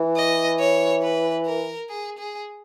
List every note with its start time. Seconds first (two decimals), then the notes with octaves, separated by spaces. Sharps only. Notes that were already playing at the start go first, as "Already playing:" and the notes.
Already playing: E3
0.16 D#5
0.59 C#5
1.02 B4
1.46 A#4
1.89 G#4
2.18 G#4